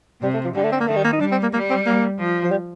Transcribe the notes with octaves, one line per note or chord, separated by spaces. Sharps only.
C3 G3
A3
F3
D3 G3
A3
C4
A#3
D#3 A3
G3
A#3
D#4
G3 D4
C4
A#3
G3 A#3
C4
A#3
F3
F3
G3